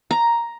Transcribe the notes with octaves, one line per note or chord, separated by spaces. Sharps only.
A#5